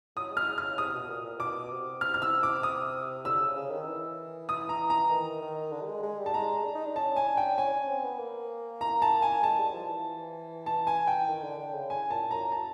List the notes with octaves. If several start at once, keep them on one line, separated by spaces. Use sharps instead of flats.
F#3 D#6
G#3
F6
F6
C#3
C3 D#6
B2
A#2
A#2
B2 D6
C3
F6
F6
E6
D6
D#6
D3 E6
C#3
C#3
D#3
E3
D#6
A#5
A#5
D#3
D#3
D3
G3
G#3
G#3
G3
A5
G#3 A#5
D4
D#4
D4
C#4 A5
G#5
D4
G5
C#4 G#5
C#4
C4
B3
A#3
A#5
A5
G#5
G#3 A5
G3
F3
E3
A5
G#5
G5
D#3
D3
D3
C#3
G#5
A#2 A5
F#2 A#5
A5